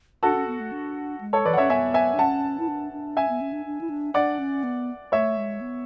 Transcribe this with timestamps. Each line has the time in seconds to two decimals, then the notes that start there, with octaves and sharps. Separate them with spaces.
0.23 D4 F#4 A4
0.36 C#4
0.47 B3
0.60 A3
0.72 D4
1.21 G#3
1.33 A4 C#5
1.45 E3 B4 D5
1.53 F#5
1.57 C#4 C#5 E5
1.70 B3 E5 G#5
1.94 E5 G#5
2.14 D4
2.19 C#4 F#5 A5
2.59 E4
2.68 D4
2.93 D4
3.17 C#4 E5 G#5
3.29 B3
3.41 C#4
3.53 D4
3.66 D4
3.81 E4
3.89 D4
4.14 D4 D5 F#5
4.39 C#4
4.64 B3
5.12 A3 C#5 E5
5.37 G#3
5.61 B3